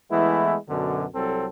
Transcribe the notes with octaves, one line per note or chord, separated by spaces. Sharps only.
E3 G#3 A3 B3 E4
F#2 B2 D3
C2 F#3 C4 A4